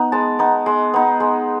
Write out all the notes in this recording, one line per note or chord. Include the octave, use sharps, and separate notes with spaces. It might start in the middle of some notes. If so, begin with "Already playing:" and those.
Already playing: B3 D#4
G#3 A5
B3 D#4
G#3
B3 D#4
G#3